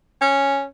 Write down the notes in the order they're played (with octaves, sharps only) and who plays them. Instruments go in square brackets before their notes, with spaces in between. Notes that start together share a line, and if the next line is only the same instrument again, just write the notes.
[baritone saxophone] C#4